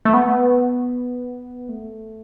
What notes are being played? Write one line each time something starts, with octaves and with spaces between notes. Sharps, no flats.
A3
B3
A3